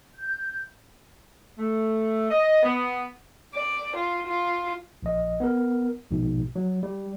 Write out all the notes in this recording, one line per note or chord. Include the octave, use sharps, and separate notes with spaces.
G6
A3
D#5
B3
D5
F4
F4
A#1 D#5
B3 A#4
A#1 G#2 B2
F#3
G3